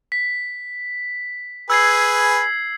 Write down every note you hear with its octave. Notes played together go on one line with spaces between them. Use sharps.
B6
G#4 B4 E6 G#6 C7